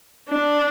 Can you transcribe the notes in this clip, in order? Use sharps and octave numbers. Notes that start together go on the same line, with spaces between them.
D4